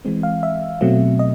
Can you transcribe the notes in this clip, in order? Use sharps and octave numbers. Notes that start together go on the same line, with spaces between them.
E3 G#3 C4
F5
E5
B2 F#3 A3 C4
D#5